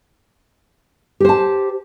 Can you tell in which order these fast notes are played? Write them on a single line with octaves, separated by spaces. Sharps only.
G4 C5 A5